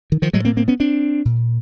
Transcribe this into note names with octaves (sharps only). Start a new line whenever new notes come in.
D#3
D#3 F3
A2 F#3 G#3
A#3 C4
A#3 C4
B3 C#4
C4 D4
A#2